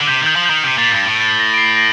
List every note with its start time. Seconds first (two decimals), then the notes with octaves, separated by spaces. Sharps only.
0.01 D3
0.07 C3 G6
0.22 D#3 G6
0.36 F3
0.45 D#3 G6
0.64 C3 G6
0.78 A#2 A6
0.92 G2 G6
1.06 A2
1.21 A6
1.39 A#6
1.54 D7
1.58 C7
1.77 A#6 D7